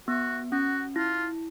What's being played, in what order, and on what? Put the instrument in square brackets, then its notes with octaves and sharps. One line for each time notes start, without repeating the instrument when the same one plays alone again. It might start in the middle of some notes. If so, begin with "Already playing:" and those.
[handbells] B3 [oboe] F#4
[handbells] C#4 [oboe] F#4
[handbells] E4 [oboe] F4